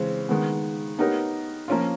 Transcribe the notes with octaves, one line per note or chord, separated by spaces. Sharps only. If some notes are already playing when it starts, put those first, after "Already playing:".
Already playing: C#3 E3 G#3 C4
D#3 G#3 B3
B3 D#4 G4 A#4 C#5
F3 A#3 C#4 F4